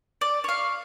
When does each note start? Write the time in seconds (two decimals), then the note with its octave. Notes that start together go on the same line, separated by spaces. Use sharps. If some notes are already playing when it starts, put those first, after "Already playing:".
0.21 D5
0.44 C#5 F5